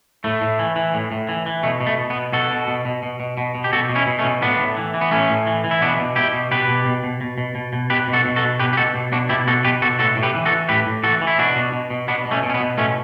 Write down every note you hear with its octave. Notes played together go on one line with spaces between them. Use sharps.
A2 A3
A2
E3
E3
A2
A2
E3
E3
B2 A3
B2
A3
B2
B3
B2
B2 F#4 A4
B2
B2
B2
B2
B2
B2
B2
G4
B2 F#4 A4
B2
C#4 E4
B2
A3 C#4
B2
A2 B3 D4
A2
E3
E3
B3
A2 A3 C#4
A2
E3
E3
E4
B2 B3 D4
B2
B2 E4 G4
B2
B2 G4 B4
B2
B2
B2
B2
B2
B2
B2
B2 G4 B4
B2
F#4 A4
B2
F#4 A4
B2
B2 G4 B4
G4
B2 F#4 A4
B2
B2 D4 F#4
B2 E4 G4
B2 F#4 A4
B2 G4 B4
B2 F#4 A4
A2 F#4 A4
A2
G4 B4
E3
F#4 A4
E3
A2 G4 B4
A2
E3 F#4 A4
E3
E4
B2 D4 F#4
B2
B2
B2
B2 B3 D4
B2
A3 C#4
B2
C#4
B3
B2
A2 A3 C#4